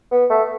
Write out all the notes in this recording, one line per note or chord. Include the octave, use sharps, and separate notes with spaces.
B3
A3